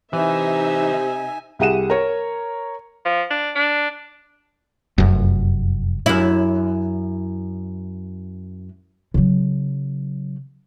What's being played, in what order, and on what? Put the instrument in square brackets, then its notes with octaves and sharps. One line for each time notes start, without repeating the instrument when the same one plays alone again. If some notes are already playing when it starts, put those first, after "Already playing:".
[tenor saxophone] C3 [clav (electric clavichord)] E3 [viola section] D#4 E5 [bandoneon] G#5
[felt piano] C2 G4 G#4 F#5 D#7 E7
A#4 C#5
[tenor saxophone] F3
D4
D4
[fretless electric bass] F1 F#2
[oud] F#2 E4
[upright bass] C#3 F#3